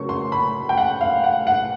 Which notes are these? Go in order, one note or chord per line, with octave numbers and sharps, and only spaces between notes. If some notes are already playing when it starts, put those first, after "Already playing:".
Already playing: C#3 F#3 A#3 C#4 C#6
C6
B5
G5
F#5
F5
F#5
F#5